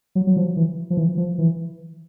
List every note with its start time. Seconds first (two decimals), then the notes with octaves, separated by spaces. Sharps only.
0.15 F#3
0.27 F#3
0.36 F3
0.57 E3
0.90 F3
0.97 E3
1.17 F3
1.38 E3